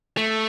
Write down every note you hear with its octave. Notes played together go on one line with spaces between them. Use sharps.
A3